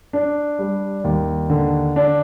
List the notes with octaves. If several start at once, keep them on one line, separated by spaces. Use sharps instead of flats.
D4
G3
D#2
D3
D4